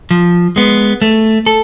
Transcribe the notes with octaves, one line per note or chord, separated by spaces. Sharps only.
F3
G#3 B3
A3
A4